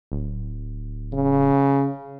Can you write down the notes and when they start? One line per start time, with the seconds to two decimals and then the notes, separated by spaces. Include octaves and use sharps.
0.12 D1
1.13 C#3